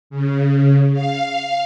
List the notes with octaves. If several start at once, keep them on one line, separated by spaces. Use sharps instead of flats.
C#3
F5